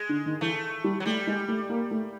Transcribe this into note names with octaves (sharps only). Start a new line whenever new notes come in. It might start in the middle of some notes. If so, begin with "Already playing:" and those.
Already playing: G#3
D3
D#3
E3 A3
G3
F#3
G3 A3
G#3
A3
A#3
A3